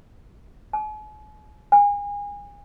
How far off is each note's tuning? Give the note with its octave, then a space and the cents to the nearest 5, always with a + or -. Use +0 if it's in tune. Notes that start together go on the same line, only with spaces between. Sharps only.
G#5 +45
G#5 -30